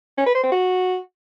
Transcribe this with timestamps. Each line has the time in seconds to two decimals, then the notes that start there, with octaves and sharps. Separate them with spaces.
0.18 C#4
0.26 B4
0.35 C5
0.43 C4
0.52 F#4